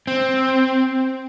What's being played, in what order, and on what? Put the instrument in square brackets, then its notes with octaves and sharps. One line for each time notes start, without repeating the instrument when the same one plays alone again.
[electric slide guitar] C4